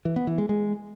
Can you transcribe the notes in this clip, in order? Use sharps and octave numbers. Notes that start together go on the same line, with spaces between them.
E3
B3
E3
G#3
G#3